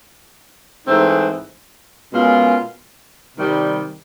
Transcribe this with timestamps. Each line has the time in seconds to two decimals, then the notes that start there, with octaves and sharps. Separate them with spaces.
0.87 G#2 E3 A3 C4 D#4
2.12 B2 G#3 C#4 F4 A#4
3.37 C3 D#3 G3